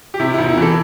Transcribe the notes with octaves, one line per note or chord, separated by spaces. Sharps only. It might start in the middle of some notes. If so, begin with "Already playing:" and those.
G4
C3 E4
E1 E4
E4
E3 A4